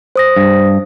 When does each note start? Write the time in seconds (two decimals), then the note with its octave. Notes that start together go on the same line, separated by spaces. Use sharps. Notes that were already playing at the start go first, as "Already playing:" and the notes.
0.16 C5 D#6 A#6
0.37 G2